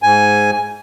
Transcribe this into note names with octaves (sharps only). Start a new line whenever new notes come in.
G#2 G#5